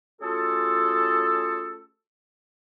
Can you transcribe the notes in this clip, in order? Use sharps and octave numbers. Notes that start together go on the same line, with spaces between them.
A3 C#4 F4 F#4 G#4 A4